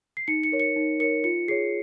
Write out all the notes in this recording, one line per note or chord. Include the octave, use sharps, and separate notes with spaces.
C7
D#4 C#7
C#7
A#4 C#5
C#7
D#4
A#4 C#5 C#7
F4 C#7
G#4 C#5 C7